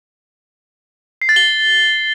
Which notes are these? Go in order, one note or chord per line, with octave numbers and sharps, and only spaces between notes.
C7
A6
G7